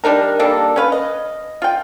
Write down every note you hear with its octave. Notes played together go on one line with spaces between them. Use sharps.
G3 D4 D#4 A#4
G3 A#3 D4 A4
C#4 B4 F5
D#5
F4 G5